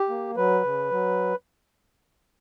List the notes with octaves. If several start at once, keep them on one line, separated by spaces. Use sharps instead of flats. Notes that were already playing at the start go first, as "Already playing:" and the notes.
Already playing: G4
A#3
F#3 B4
C#3
F#3